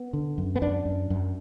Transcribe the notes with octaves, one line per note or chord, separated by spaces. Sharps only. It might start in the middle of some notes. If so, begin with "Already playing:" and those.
Already playing: B3
D3
F#2
B3
F#2 D4
F#2
F#2